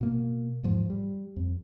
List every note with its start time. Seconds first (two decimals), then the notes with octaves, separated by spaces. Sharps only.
0.01 B2 A#3
0.63 E2 G#2 F3
0.90 G3
1.36 F2